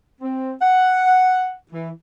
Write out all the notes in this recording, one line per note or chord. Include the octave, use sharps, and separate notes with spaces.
C4
F#5
E3